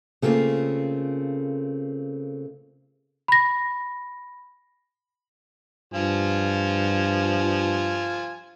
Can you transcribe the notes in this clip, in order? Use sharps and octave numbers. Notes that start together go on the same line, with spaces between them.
C#3 A3 A#3 C4 F4
B5 A#6
G2 F3 F4 G#5